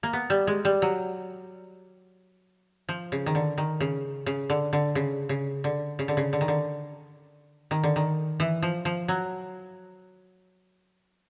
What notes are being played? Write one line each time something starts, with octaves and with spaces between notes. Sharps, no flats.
A#3
B3
G3
G#3
G3
F#3
F3
C#3
D#3
D3
D#3
C#3
C#3
D3
D3
C#3
C#3
D3
C#3
D3
C#3
D3
D#3
D3
D#3
D3
D#3
E3
F3
F3
F#3